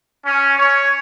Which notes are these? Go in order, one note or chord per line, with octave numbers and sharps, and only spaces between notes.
C#4
C#5